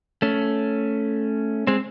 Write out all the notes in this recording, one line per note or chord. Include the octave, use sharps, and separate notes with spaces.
A3 C#4
G#3 C4